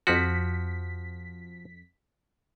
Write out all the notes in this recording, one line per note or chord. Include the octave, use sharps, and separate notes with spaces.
F2 F3 F#4 B6